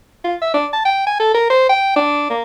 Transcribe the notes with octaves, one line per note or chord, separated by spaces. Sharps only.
F4
E5
D4
A5
G5
G#5
A4
A#4
C5
G5
D4
A#3